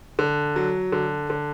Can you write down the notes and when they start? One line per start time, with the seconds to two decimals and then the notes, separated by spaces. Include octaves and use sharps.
0.19 D3
0.56 F#3
0.92 D3
1.30 D3